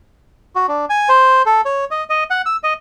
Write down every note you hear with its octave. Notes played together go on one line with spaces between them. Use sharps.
F#4
D4
G#5
C5
A4
C#5
D#5
D#5
F#5
E6
D#5